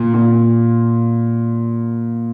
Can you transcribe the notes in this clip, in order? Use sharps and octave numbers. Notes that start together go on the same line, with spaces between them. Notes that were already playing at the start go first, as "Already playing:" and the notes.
Already playing: A#2
A#2